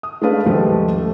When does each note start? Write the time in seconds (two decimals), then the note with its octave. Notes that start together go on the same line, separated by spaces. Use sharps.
0.03 D#6
0.22 G#3 A3 C#4 D4 B4 F5
0.45 D#2 G#2 C#3 F3 G3 A3
0.98 A3